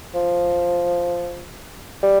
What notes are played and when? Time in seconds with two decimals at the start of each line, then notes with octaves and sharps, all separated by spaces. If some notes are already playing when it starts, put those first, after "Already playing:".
0.15 F3
2.03 G3